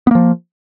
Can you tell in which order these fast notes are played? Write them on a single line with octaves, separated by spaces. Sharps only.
B3 A#3 F3